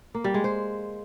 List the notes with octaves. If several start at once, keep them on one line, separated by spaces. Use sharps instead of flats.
A#3
G3
G#3
C5